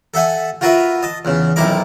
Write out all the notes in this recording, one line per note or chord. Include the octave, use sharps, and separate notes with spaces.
A4 E5 F#5 G#5
F4 F#4 A#4 B4 E5
D#5 A5
E2 C#3
B1 F2 D#3 E4 A#5 D6